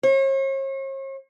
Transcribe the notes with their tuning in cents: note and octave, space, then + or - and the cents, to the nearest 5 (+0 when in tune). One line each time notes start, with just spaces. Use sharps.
C#5 -45